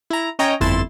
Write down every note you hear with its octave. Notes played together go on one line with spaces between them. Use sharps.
E4 A#5
C#4 C#5 D#5 G5 A#5
G1 F2 E4 C6 A6 E7